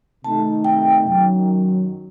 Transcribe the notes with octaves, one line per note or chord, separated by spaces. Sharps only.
C3 D#3 A3 D#4 A5
G5
F#2 D#3 F#3